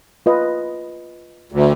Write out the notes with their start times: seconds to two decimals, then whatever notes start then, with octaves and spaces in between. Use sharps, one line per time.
0.26 F4 B4 D#5
1.52 D2